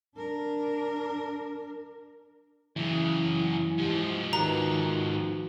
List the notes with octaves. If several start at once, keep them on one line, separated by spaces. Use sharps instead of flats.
D4 A#4
F#2 C#3 E3
G#2 F3 G4
D#3 F#4 B4 A#5